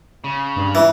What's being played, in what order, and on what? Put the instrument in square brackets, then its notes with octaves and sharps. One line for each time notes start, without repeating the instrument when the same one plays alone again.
[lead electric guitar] C#3
[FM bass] G2
[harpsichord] E3